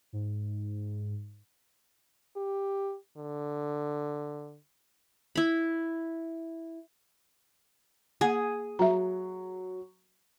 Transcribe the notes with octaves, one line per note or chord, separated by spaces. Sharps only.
G#2
G4
D3
E4 B5
A#3 G#4 F#5 G#5
F#3 E5 A#5